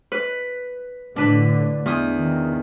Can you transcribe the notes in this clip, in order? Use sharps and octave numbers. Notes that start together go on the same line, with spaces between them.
B4
A2 D3 D4 B4
E2 D#6
D#3